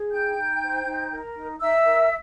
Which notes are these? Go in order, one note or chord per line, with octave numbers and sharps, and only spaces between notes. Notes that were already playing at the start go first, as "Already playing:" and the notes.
Already playing: G#4
D#4 G5 G6
D#4
C5
D#4
A#4
D#4
D#4 E5 E6
A#4